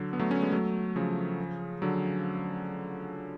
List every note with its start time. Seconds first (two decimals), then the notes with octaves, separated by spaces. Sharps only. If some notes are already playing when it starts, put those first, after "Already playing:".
Already playing: D3 F#3
0.13 B3
0.20 F#3 A3
0.31 A3 C#4
0.41 G#3 B3
0.52 F#3 A3
0.96 C#3 F3
1.82 D3 F#3